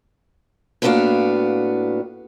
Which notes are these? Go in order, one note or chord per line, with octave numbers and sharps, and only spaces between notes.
A2 A#3 B3 D4 F#4 F5